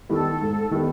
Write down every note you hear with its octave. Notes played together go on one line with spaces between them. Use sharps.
D#3 G3 B3 A4
G#2
D#3 G3 B3